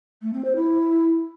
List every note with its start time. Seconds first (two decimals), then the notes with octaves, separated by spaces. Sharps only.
0.22 A3
0.33 C4
0.44 C5
0.55 E4